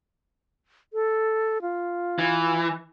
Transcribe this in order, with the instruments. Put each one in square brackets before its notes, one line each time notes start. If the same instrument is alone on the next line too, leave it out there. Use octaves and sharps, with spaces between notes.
[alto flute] A4
F4
[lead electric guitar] E3